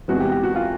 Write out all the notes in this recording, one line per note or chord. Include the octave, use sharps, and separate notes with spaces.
E2 C3 E3 G#3 F#4
G4
G4
F#4
F4